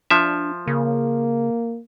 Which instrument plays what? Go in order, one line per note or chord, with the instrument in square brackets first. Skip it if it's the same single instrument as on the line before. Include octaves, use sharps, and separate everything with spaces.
[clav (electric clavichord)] F3 E5 [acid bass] D4
[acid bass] C#3 [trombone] A#3